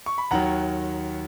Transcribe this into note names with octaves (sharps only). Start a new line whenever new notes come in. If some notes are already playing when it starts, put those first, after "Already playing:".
C#6
B5
D#2 D#3 F#3 F#5 A#5